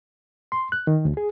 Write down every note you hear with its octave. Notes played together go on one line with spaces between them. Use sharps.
C6
F#6
D#3
D2
G#4